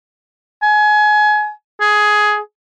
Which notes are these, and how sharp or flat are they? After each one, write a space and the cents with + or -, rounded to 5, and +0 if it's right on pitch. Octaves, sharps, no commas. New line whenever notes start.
G#5 +25
G#4 +10